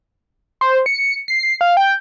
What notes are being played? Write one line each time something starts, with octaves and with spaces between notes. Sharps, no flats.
C5
C#7
C7
F5
G5